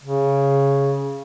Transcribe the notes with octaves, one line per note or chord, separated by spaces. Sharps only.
C#3